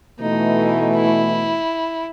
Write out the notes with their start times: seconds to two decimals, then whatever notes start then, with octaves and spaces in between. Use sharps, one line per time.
0.20 B2 E3 A3 D#4
0.96 E4